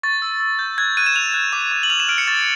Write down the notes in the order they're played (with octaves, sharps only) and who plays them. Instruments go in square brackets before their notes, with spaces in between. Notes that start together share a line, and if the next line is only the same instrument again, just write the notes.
[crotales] C#6 A6
E6
E6
G6
F#6 G#6
F#6 D#7
E7
F#6 F7
F#6
D6
D6
F#7
F6 F7
E7
F6 D7
C#7
C#6 A6